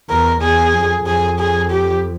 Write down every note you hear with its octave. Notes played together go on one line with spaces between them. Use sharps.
E2 A#4
E2 G#4
F2
F2 G#4
G#4
G4